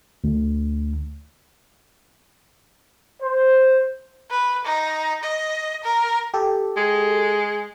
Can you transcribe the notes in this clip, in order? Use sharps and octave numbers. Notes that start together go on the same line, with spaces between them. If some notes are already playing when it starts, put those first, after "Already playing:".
D2
C5
B4
D#4
D#5
A#4
G4 A4
G#3